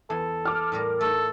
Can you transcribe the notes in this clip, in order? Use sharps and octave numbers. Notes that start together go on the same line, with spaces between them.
E2 G#4 A4
D6 F6
A2 G3 A#4
A3 D#4 A4